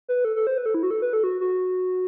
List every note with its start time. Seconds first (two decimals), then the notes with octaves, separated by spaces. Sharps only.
0.09 B4
0.25 A4
0.36 A4
0.47 C5
0.58 B4
0.66 A4
0.74 E4
0.83 F#4
0.91 A4
1.02 B4
1.13 A4
1.24 F#4
1.40 F#4